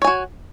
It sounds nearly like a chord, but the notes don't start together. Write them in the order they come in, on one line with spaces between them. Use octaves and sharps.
C#5 G#5 F#4